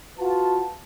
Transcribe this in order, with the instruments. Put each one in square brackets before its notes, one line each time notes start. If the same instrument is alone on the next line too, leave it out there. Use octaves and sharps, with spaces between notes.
[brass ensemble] F4 F#4 B4 A5